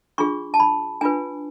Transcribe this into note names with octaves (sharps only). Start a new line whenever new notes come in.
D4 F4 G#4 C#6
A5
B5
D4 F4 B4 G#5